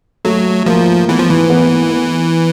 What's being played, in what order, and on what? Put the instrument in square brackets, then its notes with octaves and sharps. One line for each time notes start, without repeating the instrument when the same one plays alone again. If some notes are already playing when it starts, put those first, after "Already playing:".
[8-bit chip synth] F#3 [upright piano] A3
[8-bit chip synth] F3 [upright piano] A#3
[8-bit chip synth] E3 [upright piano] B3
[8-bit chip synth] F3
E3
[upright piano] B3
B3